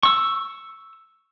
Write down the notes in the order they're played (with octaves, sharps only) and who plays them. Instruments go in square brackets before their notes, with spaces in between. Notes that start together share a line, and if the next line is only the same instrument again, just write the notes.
[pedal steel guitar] C#6 E6